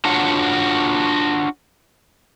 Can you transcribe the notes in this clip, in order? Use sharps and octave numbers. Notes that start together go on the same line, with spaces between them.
D4 F4 F#4 C#5 F#5